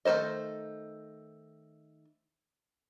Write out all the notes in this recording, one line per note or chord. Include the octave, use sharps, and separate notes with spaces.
D#3 A3 G#4 C5 D#5